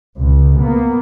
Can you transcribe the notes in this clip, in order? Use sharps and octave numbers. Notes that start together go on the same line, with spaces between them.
C#2
A#3 B3